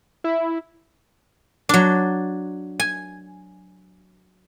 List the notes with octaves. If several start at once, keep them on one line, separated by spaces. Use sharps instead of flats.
E4
F#3 D4
G#5